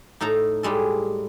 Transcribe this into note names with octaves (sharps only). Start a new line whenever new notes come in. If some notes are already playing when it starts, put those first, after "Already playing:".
A2 D#4 A4 A#5
A2 G3 G#3 A4